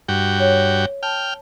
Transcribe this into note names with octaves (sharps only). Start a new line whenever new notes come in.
G2 F#4 G5
C#5
G5 A5 F6